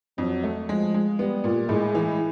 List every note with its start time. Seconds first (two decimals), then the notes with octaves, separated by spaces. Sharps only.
0.18 F2 F#3
0.43 A3
0.69 F3 G#3
0.94 G#3
1.19 G3 B3
1.44 A#2
1.69 A2 G#3
1.95 E3